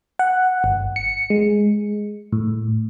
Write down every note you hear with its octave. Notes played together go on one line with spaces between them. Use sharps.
F#5
G1
C#7
G#3
A2